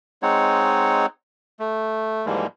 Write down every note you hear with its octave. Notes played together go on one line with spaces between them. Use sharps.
G#3 C4 D#4 C#5 F#5
A3
G#2 E3 F3 G3 G#3 A#3